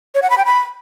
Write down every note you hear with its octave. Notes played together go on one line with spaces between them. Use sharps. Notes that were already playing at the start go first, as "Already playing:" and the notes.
C#5
F#5
B5
G5
B5